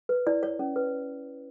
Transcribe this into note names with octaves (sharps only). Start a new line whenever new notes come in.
B4
E4 D5
C#5
C#4
B4